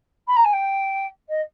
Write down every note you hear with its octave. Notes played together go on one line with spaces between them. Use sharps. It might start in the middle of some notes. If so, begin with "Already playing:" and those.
B5
A#5
G#5
G5
D#5